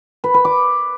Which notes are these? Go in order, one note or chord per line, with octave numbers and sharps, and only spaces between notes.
B4
B4
D6